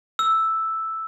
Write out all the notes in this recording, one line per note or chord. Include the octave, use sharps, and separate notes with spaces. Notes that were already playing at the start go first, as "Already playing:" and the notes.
E6